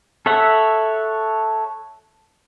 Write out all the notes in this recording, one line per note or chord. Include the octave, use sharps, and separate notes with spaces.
A4 C#5 E5 F#5